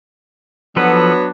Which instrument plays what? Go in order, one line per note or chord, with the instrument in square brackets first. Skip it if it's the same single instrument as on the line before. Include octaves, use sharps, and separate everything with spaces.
[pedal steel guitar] F3 A4 B4 [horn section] F#3 B3 D4